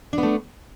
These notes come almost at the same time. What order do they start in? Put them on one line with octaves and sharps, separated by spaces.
D4 B3 A3